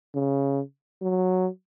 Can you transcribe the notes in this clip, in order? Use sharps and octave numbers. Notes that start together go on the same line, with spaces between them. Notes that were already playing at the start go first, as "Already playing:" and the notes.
C#3
F#3